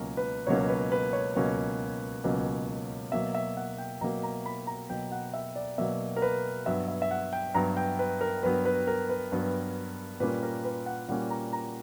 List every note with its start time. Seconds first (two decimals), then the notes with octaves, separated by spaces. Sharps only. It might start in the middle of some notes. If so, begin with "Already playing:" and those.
Already playing: C#2 B2 F#3 A#3 C#4 A#4
0.17 B4
0.47 C#2 B2 F#3 A#3 C#4 C#5
0.69 B4
0.92 B4
1.13 C#5
1.35 C#2 B2 F#3 A#3 C#4
2.24 C#2 B2 F#3 A#3 C#4
3.12 B2 F#3 A#3 E5
3.35 E5
3.57 F#5
3.78 G5
4.01 B2 F#3 A#3 A#5
4.23 A#5
4.46 B5
4.67 A#5
4.89 B2 F#3 A#3 G5
5.12 F#5
5.34 E5
5.56 D5
5.78 B2 F#3 A#3 E5
6.16 A#4
6.22 B4
6.66 G2 F#3 B3 E5
6.88 E5
7.02 E5
7.11 F#5
7.33 G5
7.54 G2 F#3 B3 A#5
7.77 G5
7.99 B4
8.21 A#4
8.43 G2 F#3 B3 B4
8.65 B4
8.87 A#4
9.09 B4
9.32 G2 F#3 B3
10.20 A#2 G3 A#3 C#4 B4
10.43 A#4
10.64 B4
10.86 F#5
11.08 A#2 G3 A#3 C#4 F#5
11.30 A#5
11.53 A#5